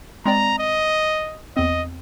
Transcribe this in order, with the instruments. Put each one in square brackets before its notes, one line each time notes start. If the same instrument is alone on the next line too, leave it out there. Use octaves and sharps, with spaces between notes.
[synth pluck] G#3 C4 D5 [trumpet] A#5
[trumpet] D#5
[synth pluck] E2 C4 [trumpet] D#5